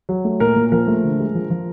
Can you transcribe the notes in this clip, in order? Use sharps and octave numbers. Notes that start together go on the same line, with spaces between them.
F#3
A3
A#2 A#4
A#2
F3 A#4
A3
D3
G#3
F3
F3